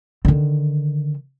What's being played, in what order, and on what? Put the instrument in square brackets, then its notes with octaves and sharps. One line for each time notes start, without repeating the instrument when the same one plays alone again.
[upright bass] D3 D#3